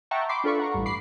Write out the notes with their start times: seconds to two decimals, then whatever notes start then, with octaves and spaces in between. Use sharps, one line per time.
0.11 E5 F#5 G5 A5 A#5 C#6
0.29 E5 B5 C6 D6 C7
0.44 D4 F4 A4 B4 B5 C#6
0.59 F#5 A#5 C#6
0.74 A1 G2
0.86 B5 D6 C7